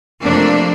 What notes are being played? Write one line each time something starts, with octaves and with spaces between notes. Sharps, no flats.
F2 C3 F3 A3 A#3 D4